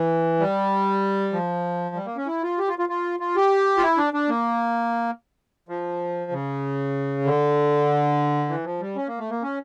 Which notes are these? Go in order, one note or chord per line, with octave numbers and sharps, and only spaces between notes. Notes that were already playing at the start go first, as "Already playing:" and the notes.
Already playing: E3
G3
F3
G3
A#3
C#4
E4
F4
G4
F4
F4
F4
F4
G4
F4
E4
D4
D4
A#3
F3
C#3
D3
E3
F3
G3
C#4
A#3
A3
A#3
C#4